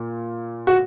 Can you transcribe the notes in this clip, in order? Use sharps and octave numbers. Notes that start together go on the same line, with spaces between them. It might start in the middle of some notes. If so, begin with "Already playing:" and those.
Already playing: A#2 A#3
F#4